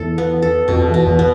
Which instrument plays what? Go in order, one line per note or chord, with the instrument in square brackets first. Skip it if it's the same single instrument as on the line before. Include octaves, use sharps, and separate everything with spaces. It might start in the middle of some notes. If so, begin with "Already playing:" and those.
Already playing: [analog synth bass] E2 [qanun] A4
[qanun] B3
A4
[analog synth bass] F2 [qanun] B2
[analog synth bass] E2
[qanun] B2
[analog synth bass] E2
[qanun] B3